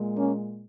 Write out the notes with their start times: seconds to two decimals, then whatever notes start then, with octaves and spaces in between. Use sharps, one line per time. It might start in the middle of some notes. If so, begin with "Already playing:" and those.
Already playing: A#2 G#3
0.15 A#3 C#4